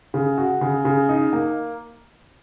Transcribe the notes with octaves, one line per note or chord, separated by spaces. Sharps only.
C#3
F#4
C#3
C#3
D#4
A#3